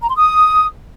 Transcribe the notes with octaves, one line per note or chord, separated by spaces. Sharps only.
A#5
C6
D#6